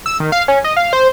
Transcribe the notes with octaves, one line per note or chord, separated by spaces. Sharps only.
E6
D#3
F5
C#4
D#5
F5
C5